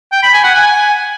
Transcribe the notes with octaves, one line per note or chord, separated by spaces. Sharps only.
G5
B5
G#5
F#5
G#5